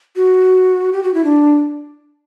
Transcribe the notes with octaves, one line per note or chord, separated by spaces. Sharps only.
F#4
G4
F#4
E4
D4